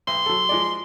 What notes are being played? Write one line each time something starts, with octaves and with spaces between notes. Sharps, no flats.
B1 C6
F#3 A4
F3 G#3 D5